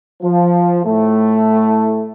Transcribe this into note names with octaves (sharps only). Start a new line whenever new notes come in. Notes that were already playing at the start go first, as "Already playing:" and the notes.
F3
A2 A3